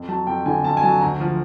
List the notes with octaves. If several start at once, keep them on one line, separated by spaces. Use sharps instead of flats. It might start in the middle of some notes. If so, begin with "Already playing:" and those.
Already playing: F2
F#3 A5
F2 G5
D3 G#5
F2 A5
G#5
F#3 A5
D2 A#5
F3